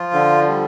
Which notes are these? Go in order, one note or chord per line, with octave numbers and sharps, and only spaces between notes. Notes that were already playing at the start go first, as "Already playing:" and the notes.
Already playing: F3 F4
D3
G3